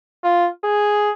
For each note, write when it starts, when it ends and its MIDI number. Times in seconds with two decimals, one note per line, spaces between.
0.23 0.49 65
0.64 1.10 68